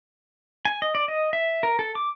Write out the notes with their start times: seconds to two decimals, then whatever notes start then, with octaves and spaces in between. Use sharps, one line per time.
0.65 G#5
0.82 D#5
0.95 D5
1.08 D#5
1.33 E5
1.63 A#4
1.79 A4
1.95 D6